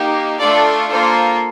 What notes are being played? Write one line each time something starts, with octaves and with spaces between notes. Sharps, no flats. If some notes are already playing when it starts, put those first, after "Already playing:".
Already playing: A#3 D#4 G4
A3 D4 F4 A4 D5
A#3 F4 A4 C5